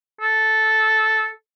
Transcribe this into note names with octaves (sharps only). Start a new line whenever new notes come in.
A4